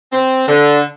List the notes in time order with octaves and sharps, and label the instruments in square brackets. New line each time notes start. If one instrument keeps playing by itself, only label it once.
[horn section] C4
D3